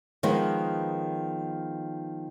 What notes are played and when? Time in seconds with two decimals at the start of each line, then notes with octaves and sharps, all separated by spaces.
0.23 D#3 F3 G#3 B3